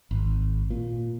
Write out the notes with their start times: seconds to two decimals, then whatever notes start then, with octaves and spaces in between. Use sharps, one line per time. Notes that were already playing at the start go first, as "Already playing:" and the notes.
0.11 G#1
0.70 A#2